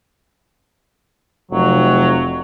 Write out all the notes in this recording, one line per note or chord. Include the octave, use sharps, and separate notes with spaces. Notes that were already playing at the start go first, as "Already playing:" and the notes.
F1 F#3